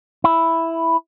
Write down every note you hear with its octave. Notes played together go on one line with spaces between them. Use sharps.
E4